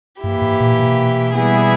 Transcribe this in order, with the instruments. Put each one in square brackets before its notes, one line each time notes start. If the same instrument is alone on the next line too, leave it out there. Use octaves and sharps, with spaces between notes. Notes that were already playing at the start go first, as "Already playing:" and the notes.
[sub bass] G2 [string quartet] E3 A#3 E4 G4
[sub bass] G#2
A#2
B2
[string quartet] E3 G3 B3 E4 G#4